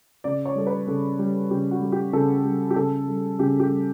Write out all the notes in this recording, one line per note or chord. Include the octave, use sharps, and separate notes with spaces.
C#3 D5
C#5
G3 A4
B4
C#3 A4
G3
C#3 G4
F#4
G3
G4
C#3 A4
G3
G4
C#3 A4
G3
C#3 G4
G4
G3